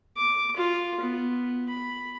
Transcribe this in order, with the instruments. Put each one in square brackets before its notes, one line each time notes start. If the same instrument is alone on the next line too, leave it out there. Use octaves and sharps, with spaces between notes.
[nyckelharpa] D6
F4
B3
B5